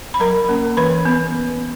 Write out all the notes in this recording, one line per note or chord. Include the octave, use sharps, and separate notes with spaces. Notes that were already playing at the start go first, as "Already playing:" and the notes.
B5
F#3 A#4 A#5
A#3 C#4
E3 B4 B5
B3